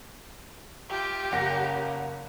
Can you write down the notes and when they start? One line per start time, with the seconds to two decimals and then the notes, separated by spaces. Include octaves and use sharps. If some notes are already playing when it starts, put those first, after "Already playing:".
0.90 F4 G4 E5 G5
1.32 F#1 C#3 A#3 F#5 A#6